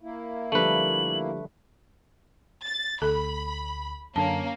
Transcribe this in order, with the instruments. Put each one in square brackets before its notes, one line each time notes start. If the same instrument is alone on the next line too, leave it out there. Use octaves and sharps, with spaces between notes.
[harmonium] A#3 E4
[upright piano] D3 F3 G3 [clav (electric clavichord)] A3 B4 [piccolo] F#7
[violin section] A6
[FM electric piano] D2 [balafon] A4 [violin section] B5
[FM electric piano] F#2 D3 [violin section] A#3 C#4 [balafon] A5